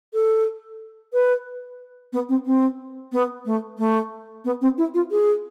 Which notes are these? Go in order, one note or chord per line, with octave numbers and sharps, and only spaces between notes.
A4
B4
B3
C4
C4
B3
A3
A3
B3
C4
E4
F4
G#4